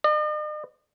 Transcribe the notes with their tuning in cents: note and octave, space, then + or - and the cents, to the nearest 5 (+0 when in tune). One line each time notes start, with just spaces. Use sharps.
D#5 -45